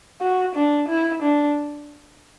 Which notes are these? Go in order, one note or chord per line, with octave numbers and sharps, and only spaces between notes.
F#4
D4
E4
D4